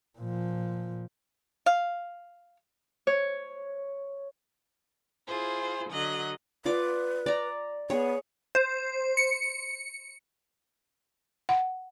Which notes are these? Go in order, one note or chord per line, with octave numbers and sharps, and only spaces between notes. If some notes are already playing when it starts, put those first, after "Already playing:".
A#2 F3
F5
C#5
E4 F4 G#4 C5
D3 F#3 D#5 F#6
F4 B4 D5 D6
D5 A#5
B3 G#4 C#5
C5
C#7
F#5